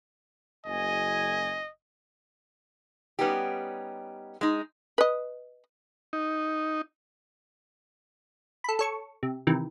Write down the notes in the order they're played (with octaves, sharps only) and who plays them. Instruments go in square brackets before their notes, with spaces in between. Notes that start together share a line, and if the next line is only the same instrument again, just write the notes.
[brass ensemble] F#1 G#5 [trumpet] D#5
[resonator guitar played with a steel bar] G3 B3 C#4 D#4 G4
G#3 D#4
[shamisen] B4 D#5
[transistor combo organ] D#4
[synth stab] A4 B5
A4 C#5 C#6
C3
C3 D#3 E3